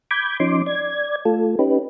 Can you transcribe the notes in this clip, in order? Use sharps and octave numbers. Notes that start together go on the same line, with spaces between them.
B5 D6 G6 G#6
F3 C#4 D#4 C6 D6
D5 G#6
A3 F4 A4
C#4 D#4 G4 B4